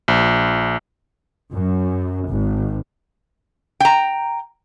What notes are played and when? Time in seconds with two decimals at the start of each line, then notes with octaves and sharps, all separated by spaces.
0.08 A#1
1.54 F#2
2.29 G#1
3.80 G5 A#5